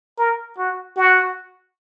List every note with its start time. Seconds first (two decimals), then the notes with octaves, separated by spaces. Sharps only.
0.19 A#4
0.58 F#4
0.97 F#4